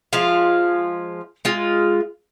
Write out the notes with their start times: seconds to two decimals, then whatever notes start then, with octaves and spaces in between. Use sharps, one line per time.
0.13 F3 G#3 F4 F5
1.45 G#3 F4